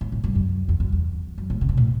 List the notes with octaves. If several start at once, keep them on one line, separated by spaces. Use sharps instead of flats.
A2
A2
G2
F#2
E2
F#2
E2
F#2
A2
C3
B2
A2